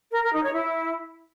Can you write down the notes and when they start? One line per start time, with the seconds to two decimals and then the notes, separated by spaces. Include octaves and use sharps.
0.12 A#4
0.23 A#4
0.33 D#4
0.43 C#5
0.54 E4